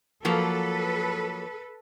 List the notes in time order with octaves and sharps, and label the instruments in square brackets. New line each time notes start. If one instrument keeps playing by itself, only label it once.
[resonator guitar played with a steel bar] F3 F#3 A#3 [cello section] A4 B4